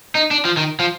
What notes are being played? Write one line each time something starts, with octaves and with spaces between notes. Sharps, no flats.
D#4
D4
F3
D#3
F3